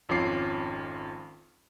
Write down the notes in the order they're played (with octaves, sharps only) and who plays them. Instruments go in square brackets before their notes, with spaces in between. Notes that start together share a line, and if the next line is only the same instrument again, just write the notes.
[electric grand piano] G#1 F2 C#4 F4 D6 C7